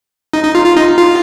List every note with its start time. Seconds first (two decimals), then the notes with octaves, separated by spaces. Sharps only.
0.33 D#4
0.44 D#4
0.55 F4
0.66 F4
0.77 D#4
0.98 F4